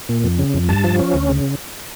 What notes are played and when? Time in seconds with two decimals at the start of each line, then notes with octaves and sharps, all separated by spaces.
0.09 A#2
0.24 F2
0.39 C#3
0.54 F2
0.69 G2 A5
0.84 F3
0.99 C#4
1.14 D2
1.29 C#3